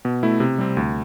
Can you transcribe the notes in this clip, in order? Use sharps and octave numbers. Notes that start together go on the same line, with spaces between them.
B2
A3 E4
C3
G3 C4
D2